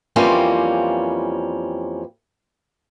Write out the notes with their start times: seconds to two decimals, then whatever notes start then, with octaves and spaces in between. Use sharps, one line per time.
0.16 F2 E3 G3 A#3 C4 C#4